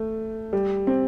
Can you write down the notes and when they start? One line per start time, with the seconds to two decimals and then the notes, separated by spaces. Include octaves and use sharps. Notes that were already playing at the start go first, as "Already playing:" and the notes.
Already playing: A3
0.53 G3
0.87 C4